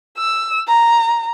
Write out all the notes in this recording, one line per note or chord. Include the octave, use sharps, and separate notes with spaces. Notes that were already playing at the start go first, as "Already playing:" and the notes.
E6
A#5